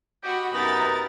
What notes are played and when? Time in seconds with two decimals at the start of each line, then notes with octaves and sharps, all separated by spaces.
0.23 F#4 G4 D#5 B5
0.54 F#2 C3 B3 D#4 A#4 A6